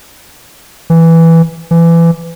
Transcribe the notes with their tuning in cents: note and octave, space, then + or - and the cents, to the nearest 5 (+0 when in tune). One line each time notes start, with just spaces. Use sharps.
E3 +0
E3 +25